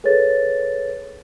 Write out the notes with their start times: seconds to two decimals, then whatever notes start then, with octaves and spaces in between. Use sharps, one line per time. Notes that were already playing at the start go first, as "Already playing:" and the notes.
0.04 G#4 A4 B4 C#5 A6